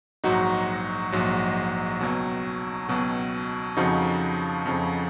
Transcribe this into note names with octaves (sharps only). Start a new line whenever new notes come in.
A#1 G#2 F#3 D#4 F#4
A#1 G#2 F#3
C#2 B2 F#3
C#2 B2 F#3
F2 C#3 F3 D#4 F#4
F2 C#3 F3